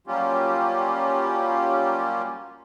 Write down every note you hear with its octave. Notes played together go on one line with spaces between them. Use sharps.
F#3 G3 A#3 C#4 F4 G4